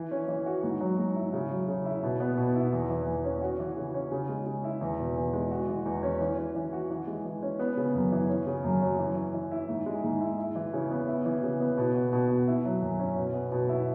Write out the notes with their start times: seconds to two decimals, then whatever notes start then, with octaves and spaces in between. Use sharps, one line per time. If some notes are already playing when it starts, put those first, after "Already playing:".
Already playing: E3
0.11 C#4
0.28 E3
0.46 F#4
0.63 G#2
0.81 F#3
0.98 G#2
1.16 E4
1.33 C#3
1.50 F#3
1.68 C#3
1.85 E4
2.03 B2
2.20 B3
2.37 B2
2.55 E4
2.72 E2
2.90 E3
3.07 E2
3.24 C#4
3.42 F#4
3.60 E3
3.77 C#3
3.94 C#4
4.12 C#3
4.29 G#3
4.46 C#3
4.64 E4
4.81 E2
4.99 B2
5.16 E2
5.33 G#3
5.51 F#4
5.68 E3
5.86 E2
6.03 C#4
6.21 E3
6.38 C#4
6.56 E3
6.73 F#4
6.90 E3
7.07 G#3
7.25 E3
7.43 C#4
7.59 B3
7.77 C#3
7.95 F#2
8.12 E3
8.29 C#4
8.47 C#3
8.64 F#2
8.82 F#3
8.99 E3
9.16 C#4
9.34 E3
9.51 E4
9.69 G#2
9.86 G#3
10.03 G#2
10.21 E4
10.38 E4
10.55 E3
10.73 C#3
10.91 B3
11.08 E4
11.25 E3
11.43 C#3
11.60 B3
11.78 B2
11.95 B3
12.13 B2
12.30 F#4
12.48 E4
12.65 F#3
12.82 F#2
12.99 C#4
13.17 B2
13.34 B3
13.52 B2
13.69 E4